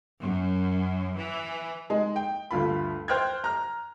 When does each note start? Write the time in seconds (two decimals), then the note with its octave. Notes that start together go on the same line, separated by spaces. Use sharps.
0.20 F#2
1.16 E3
1.90 G#3 D#4
2.16 G5
2.51 D2 G2 F4 B5
3.08 C5 G5 F6 F#6 G#6
3.44 A#5 F6